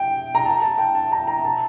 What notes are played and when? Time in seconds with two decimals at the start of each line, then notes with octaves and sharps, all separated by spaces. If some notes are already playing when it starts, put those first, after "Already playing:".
Already playing: G5
0.35 A#5
0.45 A5
0.62 A5
0.78 G5
0.95 A5
1.12 A#5
1.27 A#5
1.45 A5